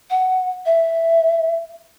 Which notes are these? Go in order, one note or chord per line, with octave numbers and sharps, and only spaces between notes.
F#5
E5